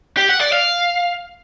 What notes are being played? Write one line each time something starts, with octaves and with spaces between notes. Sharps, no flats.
G4
F#5
D5
F5